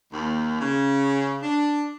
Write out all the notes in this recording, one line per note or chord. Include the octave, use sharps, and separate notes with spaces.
D#2
C#3
D4